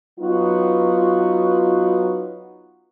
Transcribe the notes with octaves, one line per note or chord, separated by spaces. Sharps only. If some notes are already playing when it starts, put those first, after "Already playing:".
F#3 B3 D#4 F4 F#4